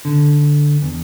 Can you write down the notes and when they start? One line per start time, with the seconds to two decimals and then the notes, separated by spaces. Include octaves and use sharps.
0.05 D3
0.82 E2